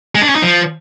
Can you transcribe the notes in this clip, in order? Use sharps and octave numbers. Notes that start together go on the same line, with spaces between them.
G#3
D4
C#4
D#4
F3